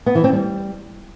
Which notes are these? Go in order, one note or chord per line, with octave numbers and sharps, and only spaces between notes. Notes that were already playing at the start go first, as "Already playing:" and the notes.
B3
E3
C4
G3